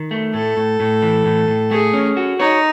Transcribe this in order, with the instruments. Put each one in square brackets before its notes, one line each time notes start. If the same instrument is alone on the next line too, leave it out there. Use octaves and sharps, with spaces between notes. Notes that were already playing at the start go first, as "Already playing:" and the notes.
Already playing: [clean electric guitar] D#3
A3
[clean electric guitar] A2 [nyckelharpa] A4
[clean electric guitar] A2
A2
E3
A2
A2
[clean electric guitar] A3 [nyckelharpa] G#4
[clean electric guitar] C#4
F#4
[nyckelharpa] D#4 [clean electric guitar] C#5